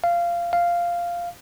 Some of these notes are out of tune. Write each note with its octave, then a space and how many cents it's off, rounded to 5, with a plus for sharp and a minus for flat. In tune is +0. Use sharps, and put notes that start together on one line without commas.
F5 -15
F5 -5